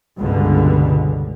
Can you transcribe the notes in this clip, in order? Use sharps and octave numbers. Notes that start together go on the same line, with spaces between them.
C#2 G2 B2 D3